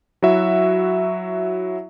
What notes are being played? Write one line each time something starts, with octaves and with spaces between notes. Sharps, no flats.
F#3 E4 F#4 E5